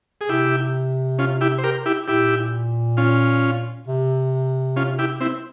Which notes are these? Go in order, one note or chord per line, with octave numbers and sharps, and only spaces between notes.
G#4
C3 E4 G4
C#4 F4
E4 G4
C5
G4 A#4
E4 G4
A#2 E4 G4
C#4 F4
C3
C#4 F4
E4 G4
C4 E4